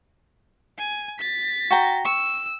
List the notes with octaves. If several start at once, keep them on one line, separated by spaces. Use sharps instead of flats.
G#5
A6 B6
F#4 G5 A#5
C#6 E6